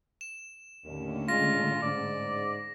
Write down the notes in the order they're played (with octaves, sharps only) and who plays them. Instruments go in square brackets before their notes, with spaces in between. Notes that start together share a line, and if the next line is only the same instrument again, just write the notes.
[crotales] E7
[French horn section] D#2 [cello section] A2 D3 C#4
[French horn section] G#3 [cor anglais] F4 [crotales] A#6
[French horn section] G#2 [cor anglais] D5